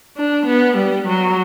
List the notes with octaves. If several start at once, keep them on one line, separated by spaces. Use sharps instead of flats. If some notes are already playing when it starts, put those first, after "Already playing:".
D4
B3
G3
F#3